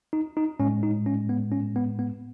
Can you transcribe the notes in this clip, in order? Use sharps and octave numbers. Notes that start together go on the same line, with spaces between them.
D#4
D#4
A2 G#3 C#4
D#4
C#4
B3
C#4
B3
B3